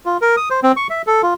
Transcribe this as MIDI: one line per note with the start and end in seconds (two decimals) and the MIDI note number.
0.05 0.17 65
0.22 0.36 70
0.37 0.49 87
0.50 0.60 72
0.63 0.72 60
0.77 0.87 85
0.90 1.02 76
1.07 1.22 69
1.23 1.34 65